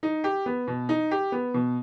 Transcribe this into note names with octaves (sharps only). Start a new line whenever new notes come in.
D#4
G4
B3
B2
D#4
G4
B3
B2